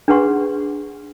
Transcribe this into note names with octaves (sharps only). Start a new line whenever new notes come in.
D4 G#4 B4 F#5 C6 C#6